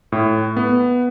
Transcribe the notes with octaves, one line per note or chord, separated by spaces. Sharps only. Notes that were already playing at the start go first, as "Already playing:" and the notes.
A2
B3